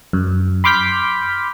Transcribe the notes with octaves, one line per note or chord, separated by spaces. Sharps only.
F#2
B5 C6 D6 F6 G6 B6